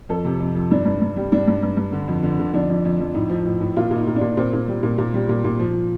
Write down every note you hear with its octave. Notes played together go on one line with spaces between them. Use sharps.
F2 A4
C3
F2
F2
G2 D4
G2
G2
G3
G2 D4
G2
G2
G2
D3
F2
D3
D3
F2 D4
F2
F2
F2
A2 D#4
F3
A2
A2
A#2 F4
A#2
D#4
A#2
D4
A#2
A#2 C4
A#2
G3
A#2
A#2
G3
A#2
A#2
F3